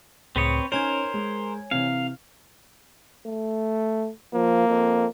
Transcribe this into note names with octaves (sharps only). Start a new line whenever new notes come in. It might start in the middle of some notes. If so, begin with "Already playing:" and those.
C#2 A2 C4 B4 C#5 D#6
C#4 D#4 A#4 C5 C#5 G#5 G#6
G#3
C3 E3 F5
A3
F3 A#3
F2